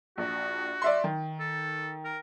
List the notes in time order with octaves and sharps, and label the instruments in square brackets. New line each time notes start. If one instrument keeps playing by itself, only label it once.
[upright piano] A#1 [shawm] F#4
[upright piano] D5 E5 C6
D#3
[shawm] A4
A#4